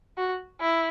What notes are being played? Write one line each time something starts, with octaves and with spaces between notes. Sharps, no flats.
F#4
E4